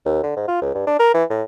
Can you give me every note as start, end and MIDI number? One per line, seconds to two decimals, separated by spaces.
0.06 0.21 39
0.24 0.32 50
0.36 0.45 44
0.48 0.60 65
0.62 0.74 37
0.75 0.85 43
0.87 0.98 62
1.00 1.09 70
1.14 1.24 52
1.30 1.43 45